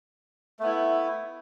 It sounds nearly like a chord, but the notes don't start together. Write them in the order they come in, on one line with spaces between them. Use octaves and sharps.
A3 B3 E4